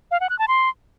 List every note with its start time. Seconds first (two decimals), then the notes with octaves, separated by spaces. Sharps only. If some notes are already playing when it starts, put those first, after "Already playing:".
0.11 F5
0.20 F#5
0.30 F#6
0.39 A5
0.48 C6